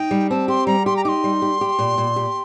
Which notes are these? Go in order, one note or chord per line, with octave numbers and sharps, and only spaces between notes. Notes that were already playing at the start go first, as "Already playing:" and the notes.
Already playing: D#4 G5
G3
C4 A5
G4 C6
G3 A#5
G4 C6
A#5
D#4 C6 D6
G3
G4
G4
A#2
A#2
G4